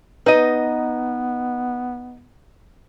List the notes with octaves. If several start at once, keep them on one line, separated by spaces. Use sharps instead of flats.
B3 D#4 B4 D#5